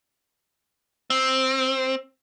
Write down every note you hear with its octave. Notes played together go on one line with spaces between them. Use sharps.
C4